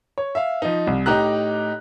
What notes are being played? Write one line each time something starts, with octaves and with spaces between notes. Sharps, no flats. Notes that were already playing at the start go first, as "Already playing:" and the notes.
C#5
E5 F5
F3 D#4
C2
A2 D#4 G4 A#5 F#6